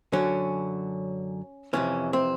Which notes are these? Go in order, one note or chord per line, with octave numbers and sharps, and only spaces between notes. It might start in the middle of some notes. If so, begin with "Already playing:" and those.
F#2 D3 F#3 C#4
F2 C3 E3 C#4
C4